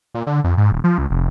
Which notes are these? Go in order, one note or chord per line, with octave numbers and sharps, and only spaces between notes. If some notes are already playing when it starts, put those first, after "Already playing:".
A#2
D3
F2
G#2
D#1
F3
C#2
F1